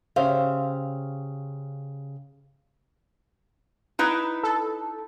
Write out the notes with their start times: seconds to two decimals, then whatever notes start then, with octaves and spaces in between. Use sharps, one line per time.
0.16 C#3 G4 C5 E5 F5
3.99 D#4 E4 B4
4.44 A4